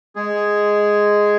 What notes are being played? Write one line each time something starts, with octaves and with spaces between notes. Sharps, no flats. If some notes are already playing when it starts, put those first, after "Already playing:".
G#3 G#4